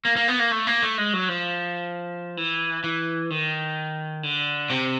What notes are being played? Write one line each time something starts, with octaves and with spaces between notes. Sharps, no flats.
A#3
A#3
B3
A#3
A3
A#3
A3
G#3
F#3
F3
E3
E3
D#3
D3
C3